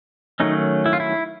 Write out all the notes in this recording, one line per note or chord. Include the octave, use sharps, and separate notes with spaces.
D#3 F#3 A3 C#4 D#4
E4
F4
E4